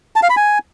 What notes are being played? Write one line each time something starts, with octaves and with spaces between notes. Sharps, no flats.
A5
F5
B5
G#5